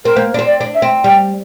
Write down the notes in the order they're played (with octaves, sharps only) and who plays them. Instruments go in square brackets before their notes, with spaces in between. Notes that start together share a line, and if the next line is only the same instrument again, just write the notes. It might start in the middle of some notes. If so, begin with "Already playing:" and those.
[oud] C4 [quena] A#4
[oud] A#3 [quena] C5
[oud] D4
C4
[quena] D5
[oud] D4
[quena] E5
[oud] C4
[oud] G3 [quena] G5